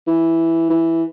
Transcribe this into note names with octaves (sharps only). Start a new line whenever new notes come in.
E3
E3